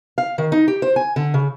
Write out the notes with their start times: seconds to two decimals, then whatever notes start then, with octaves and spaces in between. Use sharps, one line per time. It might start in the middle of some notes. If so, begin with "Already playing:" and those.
0.18 F5
0.38 D#3
0.52 D#4
0.68 G4
0.82 C5
0.96 G#5
1.16 D3
1.34 C#3